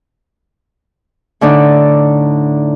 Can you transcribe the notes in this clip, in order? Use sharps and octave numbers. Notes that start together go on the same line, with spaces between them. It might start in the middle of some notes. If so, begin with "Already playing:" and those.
A2 D3 D4 D#4